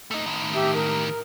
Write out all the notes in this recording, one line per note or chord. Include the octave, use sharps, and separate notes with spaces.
A3 D#4
A2 D#3
G4 E5
A#4